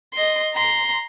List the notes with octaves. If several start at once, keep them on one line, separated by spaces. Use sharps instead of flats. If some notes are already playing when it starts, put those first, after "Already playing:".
D#5 C6
A#5 C6